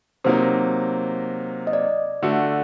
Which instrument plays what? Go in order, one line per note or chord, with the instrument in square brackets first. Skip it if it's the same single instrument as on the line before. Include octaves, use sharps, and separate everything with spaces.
[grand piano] C3 F#3 A#3 D#4 [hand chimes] C5
[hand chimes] D#5
D5
[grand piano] D3 A3 D4 F#4